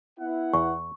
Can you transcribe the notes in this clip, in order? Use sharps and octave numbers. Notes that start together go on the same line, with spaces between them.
B3 E4 F#5
E2 C#6